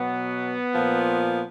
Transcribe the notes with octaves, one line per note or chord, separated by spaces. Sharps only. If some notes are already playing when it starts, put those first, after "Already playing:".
Already playing: B2 F#3 B3
A#2 F3